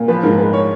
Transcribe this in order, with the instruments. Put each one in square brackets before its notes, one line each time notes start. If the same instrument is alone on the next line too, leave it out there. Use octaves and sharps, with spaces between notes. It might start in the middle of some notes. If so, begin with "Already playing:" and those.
Already playing: [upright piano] A#2
F3 B4
G#2 A#4
G#3 B4
C#5